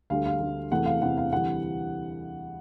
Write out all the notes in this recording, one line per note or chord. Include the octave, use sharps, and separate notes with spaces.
D2 D3 G3 F5
F5
D2 D3 G3
E2 C3 E3 A3 F#5
F5
E2 C3 E3 A3 F#5
F5
D2 C3 E3 G3 F#5